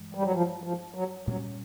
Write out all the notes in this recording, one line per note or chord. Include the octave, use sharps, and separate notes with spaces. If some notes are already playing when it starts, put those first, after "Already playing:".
Already playing: G2 E3 G#3
G3
F#3
F3
F3
F#3
A#2 F#3 G3 A#3 C#4